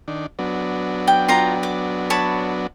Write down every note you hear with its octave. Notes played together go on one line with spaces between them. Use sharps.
D#3 D4
F#3 B3 D4
G5
F4 G5 A#5
D6
C#5 A5 B5